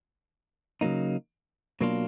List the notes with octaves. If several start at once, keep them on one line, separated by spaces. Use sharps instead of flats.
C#3 F#3 A#3 D#4
B2 F#3 A#3 D4 F4